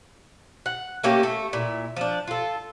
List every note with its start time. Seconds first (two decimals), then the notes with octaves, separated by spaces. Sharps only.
0.66 F#5
1.04 A3 A#3 C#4 G4
1.23 A3
1.53 A#2 E4
1.96 F3 D4
2.28 F4 A4